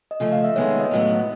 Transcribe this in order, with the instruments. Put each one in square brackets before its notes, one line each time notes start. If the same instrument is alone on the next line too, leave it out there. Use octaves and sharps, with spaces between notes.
[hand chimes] D#5
[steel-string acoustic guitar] C#3 F3 A3
[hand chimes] F5
E5
[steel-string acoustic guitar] D#3 G#3 B3 D#4 [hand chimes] C#5
[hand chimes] D#5
[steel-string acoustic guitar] A2 F#3 B3